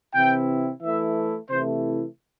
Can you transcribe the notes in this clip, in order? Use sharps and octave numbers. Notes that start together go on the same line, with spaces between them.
C3 E3 C4 E4 G5
E3 A3 E4 E5
C3 E3 A3 E4 C5